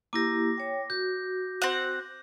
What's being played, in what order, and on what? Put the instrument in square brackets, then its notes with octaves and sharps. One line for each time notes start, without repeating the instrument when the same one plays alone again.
[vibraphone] A#3 E4 G4 [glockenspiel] D6 A#6
[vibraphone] C#5 G5
[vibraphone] F#4 [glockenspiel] G6
[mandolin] C4 F#5